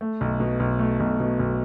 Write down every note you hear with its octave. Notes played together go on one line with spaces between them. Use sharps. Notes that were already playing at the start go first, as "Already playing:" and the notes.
A3
B1
B2
B1
A3
B1
B2
B1